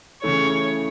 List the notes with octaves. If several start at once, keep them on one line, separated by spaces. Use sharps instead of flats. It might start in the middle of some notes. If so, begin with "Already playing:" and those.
C#3 E3 A3 E4 C#5